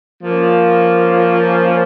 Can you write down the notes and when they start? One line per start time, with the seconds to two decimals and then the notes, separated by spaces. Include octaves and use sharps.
0.23 F3 A#3 C#4